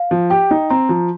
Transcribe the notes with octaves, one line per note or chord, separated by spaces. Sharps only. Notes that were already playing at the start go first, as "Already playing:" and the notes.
Already playing: F5
F3
G4 G5
D#4
C4 A#5
F3